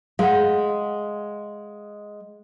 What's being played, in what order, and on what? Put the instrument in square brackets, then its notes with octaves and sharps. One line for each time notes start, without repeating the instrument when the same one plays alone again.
[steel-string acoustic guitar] G#3 [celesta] F5 F#5